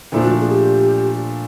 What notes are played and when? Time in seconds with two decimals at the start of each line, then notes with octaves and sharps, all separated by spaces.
0.12 A#2 F3 A3 D4 E4
0.21 F#4
0.41 G#4
0.50 G4